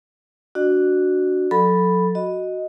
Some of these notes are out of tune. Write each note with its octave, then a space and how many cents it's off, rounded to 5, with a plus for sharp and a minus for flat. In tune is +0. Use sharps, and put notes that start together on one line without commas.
D4 -15 F#4 +0 D5 +40
F#3 -40 A4 +0 B5 +0
F#4 +0 D#5 +0